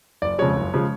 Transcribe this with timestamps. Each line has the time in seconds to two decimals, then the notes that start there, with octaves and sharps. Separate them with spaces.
0.22 F#1 D5
0.39 F2 C#3 F3 G#3 C#5
0.56 F#1
0.74 C#3 F3 G#3